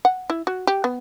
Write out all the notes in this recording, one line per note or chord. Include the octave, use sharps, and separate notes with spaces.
F#5
E4
F#4
G4
B3